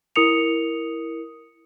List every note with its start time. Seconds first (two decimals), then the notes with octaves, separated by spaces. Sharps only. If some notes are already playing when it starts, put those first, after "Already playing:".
0.16 E4 A#4 D#6 C#7 F7